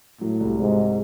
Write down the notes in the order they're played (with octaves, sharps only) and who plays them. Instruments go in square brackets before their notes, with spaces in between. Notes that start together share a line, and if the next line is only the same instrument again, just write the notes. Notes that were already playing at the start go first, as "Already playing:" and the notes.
[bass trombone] A2 [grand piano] F#3
[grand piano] C2
[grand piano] C2 [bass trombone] G#2